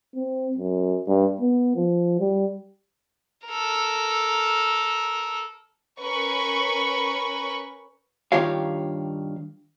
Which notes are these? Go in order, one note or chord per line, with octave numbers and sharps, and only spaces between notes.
C4
F#2
G2
B3
F3
G3
A4 A#4
C#4 A#4 B4 B5 C#6
G2 D#3 F4 G4 C#5 F5